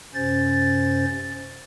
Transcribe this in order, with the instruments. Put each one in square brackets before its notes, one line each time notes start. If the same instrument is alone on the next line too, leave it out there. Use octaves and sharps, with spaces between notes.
[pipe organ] F#2 C3 C#4 C5 A6